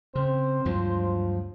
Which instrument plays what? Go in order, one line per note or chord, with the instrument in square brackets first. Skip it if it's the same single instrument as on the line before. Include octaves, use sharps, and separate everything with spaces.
[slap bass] C#3 [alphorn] C4 [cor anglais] C5
[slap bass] D2 G2 F#3 [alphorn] F3